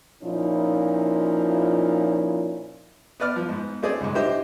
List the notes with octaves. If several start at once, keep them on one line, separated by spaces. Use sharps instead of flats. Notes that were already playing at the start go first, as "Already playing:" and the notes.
A#2 F3 C#4 D#4 E4
B3 B4 D5 F6
F3
G#2 B3
A3 C4 C#4 G#4 D5
C#2 G#2
D4 E4 G4 C5 D#5 E5